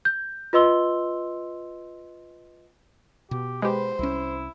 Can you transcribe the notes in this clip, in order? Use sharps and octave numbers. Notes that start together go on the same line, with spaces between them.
G6
F4 B4 D#5 C6 E6 G7
B2 G4
G#3 G4 B4 C5
C2 C#4 E4